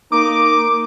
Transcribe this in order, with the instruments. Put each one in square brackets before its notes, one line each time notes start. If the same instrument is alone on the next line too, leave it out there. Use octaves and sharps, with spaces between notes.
[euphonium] A#3 [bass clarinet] D#4 [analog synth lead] D6